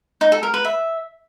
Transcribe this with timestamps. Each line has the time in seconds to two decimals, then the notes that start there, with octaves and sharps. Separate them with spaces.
0.21 D#4
0.32 A4
0.43 A#4
0.54 B4
0.65 E5